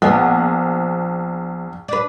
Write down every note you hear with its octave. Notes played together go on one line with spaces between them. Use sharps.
A#1 F3 B3
D4 B4